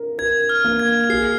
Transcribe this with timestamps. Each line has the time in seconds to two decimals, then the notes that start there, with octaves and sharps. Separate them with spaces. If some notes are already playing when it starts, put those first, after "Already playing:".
Already playing: A#4
0.18 A#4 G#6
0.49 F6
0.64 A#3
0.79 G#6
1.09 G#4 C7